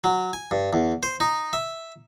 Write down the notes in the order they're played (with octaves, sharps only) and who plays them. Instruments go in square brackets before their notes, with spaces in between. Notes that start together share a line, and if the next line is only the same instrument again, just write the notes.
[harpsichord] F#3
G#5
G2
E2
C5
D#4
E5